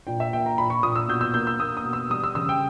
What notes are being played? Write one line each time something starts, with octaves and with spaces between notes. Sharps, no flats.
A#2 G5
E5
A#3 G5
A#5
A#2 B5
C#6
A#2 D#6
E6
B2 G6
E6
A#3 G6
E6
A#3 D#6
D#6
B2
E6
G3 D#6
E6
C#3 E6
G5